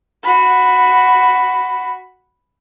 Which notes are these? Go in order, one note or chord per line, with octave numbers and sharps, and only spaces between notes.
F#4 B5